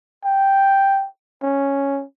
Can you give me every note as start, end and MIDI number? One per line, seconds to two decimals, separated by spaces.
0.25 1.06 79
1.42 2.04 61